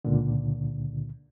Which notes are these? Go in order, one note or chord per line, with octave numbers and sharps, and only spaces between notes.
C#2 A#2 D3